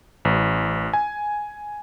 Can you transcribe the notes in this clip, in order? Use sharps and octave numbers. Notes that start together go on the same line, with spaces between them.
A1
G#5